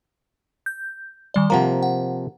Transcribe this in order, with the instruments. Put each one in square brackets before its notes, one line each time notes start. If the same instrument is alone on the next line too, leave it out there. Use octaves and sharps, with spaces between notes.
[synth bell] G6
D#3 G3 D5
[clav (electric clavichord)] C3 F3 A#3 [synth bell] F#5 A#5
[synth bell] F#5